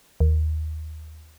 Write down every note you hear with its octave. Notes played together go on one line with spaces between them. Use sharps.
D#2